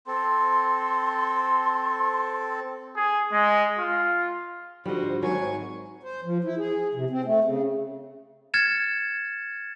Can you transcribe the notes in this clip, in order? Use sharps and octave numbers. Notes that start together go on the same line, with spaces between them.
C4 A4 C6
G#4
G#3
F4
G#1 G#2 D3 F3 G3 F#4 C5 D#5
G#1 D#3 F#3 G#5 C#6
C5
F3
E4
G#4
C3
C4
A3
C#3
F6 G#6 A6 C#7 E7